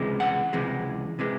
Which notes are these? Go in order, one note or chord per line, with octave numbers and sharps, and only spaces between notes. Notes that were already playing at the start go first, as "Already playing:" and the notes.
Already playing: C#2 C3 E3 G#3
F#5
C#2 C3 E3 G#3
C3 E3 G#3